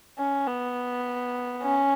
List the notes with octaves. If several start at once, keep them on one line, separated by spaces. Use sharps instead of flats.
C#4
B3
C#4